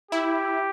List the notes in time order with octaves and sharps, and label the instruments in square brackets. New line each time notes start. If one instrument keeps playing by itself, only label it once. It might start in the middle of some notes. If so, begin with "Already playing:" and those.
[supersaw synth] E4 [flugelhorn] G4